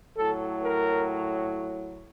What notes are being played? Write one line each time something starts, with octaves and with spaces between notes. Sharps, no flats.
A2 F#3 A4
A#4